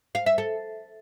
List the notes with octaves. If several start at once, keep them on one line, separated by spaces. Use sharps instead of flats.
F5
E5
A4